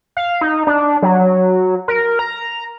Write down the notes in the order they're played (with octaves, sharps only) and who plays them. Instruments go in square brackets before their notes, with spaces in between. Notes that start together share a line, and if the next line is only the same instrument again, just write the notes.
[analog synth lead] F5
D#4
D4
F#3
A#4
A#5